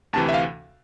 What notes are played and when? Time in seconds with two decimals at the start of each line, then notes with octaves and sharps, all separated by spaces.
0.13 D2 C3 E3 A5
0.29 E5
0.34 F5